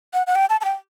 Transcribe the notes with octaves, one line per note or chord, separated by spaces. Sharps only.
F#5
F#5
G5
A5
A5
G5